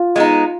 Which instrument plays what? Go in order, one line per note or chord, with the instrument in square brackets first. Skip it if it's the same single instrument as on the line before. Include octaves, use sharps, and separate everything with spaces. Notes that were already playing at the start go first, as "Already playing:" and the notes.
Already playing: [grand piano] F4
[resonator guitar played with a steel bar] G#3 B3 D#4